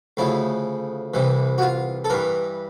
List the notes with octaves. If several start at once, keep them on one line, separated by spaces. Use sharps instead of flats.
D2 C#3 F3 E4
C2 C3 E3
F#4
F4
A4
G2 E3 A#4